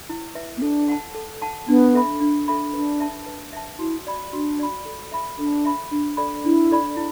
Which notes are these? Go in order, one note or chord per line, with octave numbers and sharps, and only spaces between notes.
E4
B4 E5
B3
D4 A4
F#5 A5
A4
F#5 A5
B3 D4
A4 E5 B5
D4
A4 E5 B5
D4 B4
E5 A5
B4
E5 A5
E4 F#4
D5 B5
D4 F#4
D5 B5
A4
E5 B5
D4 A4
E5 B5
D4
A4 D5 B5
D4 E4
A4 D5 B5
E4